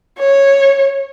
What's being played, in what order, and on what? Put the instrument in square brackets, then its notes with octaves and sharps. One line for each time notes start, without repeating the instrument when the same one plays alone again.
[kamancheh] C#5